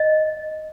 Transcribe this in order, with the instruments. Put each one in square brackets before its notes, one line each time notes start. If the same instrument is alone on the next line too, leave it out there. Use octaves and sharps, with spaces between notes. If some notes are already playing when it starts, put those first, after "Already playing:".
Already playing: [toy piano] D#5